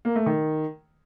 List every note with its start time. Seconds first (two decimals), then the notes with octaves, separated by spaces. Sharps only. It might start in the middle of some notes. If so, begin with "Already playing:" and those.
0.05 A#3
0.16 A3
0.26 D#3